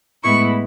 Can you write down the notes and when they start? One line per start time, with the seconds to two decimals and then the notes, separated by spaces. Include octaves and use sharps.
0.23 A2 G#3 B3 E4 C#6